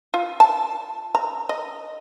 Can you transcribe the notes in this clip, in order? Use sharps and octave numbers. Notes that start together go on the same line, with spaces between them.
F4
A5
A#5
D#5